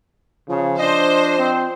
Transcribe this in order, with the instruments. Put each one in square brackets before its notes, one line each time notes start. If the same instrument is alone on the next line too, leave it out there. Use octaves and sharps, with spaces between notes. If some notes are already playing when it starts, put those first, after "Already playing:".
[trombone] C#3 [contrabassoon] F3
[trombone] D4 [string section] C5 [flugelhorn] D#5
[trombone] C4